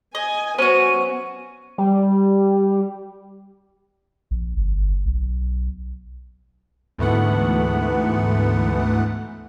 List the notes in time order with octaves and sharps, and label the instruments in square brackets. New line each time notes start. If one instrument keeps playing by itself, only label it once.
[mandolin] D#5 [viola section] G#5
[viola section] F#3 B3 [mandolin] C#4 F#4 [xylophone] C5 [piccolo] D#7
[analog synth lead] G3
[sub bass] A#1
G1
B1
[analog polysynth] D2 G#2 E3 A3 B3 F#5